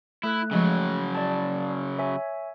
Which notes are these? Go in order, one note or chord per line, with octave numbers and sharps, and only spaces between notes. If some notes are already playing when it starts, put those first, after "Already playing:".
A3 E4 A4 F#6
C#3 F3 F#3 G#3
D5 A5
C#5 E5 G#5